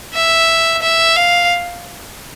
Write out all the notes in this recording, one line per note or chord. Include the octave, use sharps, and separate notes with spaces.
E5
E5
F5